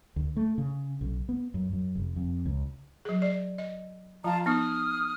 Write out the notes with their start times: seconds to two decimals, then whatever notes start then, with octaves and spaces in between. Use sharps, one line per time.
0.16 D2
0.36 A3
0.58 C#3
1.01 B1
1.29 B3
1.54 F#2
1.73 F#2
1.95 F1
2.16 F2
2.46 C#2
3.05 F#3 G#4
3.22 D5
3.58 D#5
4.24 F3 F4 A5 A#5
4.46 B3 D#4 D#6 F6